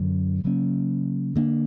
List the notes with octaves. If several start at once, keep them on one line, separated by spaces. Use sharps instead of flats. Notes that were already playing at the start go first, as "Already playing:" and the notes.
Already playing: F#2 D3 F#3
C#3 F#3 A#3 C#4
D3 A#3 D4